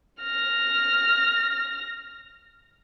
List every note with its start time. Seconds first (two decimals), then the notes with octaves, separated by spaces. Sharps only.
0.21 F6 A#6